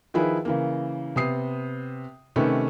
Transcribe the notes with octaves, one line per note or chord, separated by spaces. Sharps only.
D#3 F3 E4 G#4 B4
C#3 E3 A#3
C3 B3 D#6 C7
C3 D#3 A3 C#4 B4